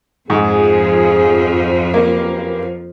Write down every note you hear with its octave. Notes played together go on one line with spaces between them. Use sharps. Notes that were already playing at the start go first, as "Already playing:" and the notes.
F2 G#2 F3 G#4
F#2 A#3 G4 B4